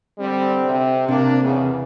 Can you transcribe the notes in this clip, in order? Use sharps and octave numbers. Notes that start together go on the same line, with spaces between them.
D3 G3 C4
C3
C3 A#3 D4
E2 C#3